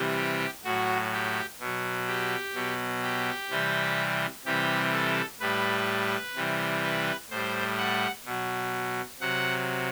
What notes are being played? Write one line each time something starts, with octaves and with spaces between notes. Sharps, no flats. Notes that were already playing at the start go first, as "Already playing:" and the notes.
Already playing: C3 E3 G3
G4
A2 F#3 F#4
G4
B2 F#3
G4
B2 F#3
G4
C3 E3 G3
C3 E3 G3 G4
A4
A2 G3 B4
C3 E3 G3
B4
A2 G3 C5
F#5
B2 F#3
C3 F#3 F#5